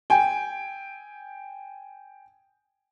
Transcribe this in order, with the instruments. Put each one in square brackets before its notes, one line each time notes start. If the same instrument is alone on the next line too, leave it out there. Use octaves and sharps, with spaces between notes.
[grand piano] G5 G#5